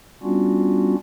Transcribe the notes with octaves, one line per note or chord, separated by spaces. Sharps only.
G3 B3 C#4 D4 F4 F#4